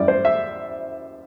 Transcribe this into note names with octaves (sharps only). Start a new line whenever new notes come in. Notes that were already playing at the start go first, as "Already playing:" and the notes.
Already playing: F#2 E3 G3 D5
C5
E5